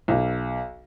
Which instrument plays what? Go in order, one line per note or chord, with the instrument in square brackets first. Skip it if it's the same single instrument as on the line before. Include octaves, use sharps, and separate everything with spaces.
[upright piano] B1